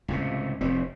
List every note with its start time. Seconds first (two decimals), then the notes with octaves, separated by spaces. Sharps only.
0.08 C#2 A2 C3
0.61 F1 A2 C4